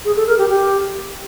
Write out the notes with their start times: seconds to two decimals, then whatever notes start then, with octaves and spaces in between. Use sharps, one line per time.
0.05 G#4
0.16 A4
0.27 A#4
0.38 G4
0.49 G4